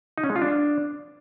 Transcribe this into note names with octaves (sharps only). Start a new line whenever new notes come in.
D#4
C#4
G#3
F4
D4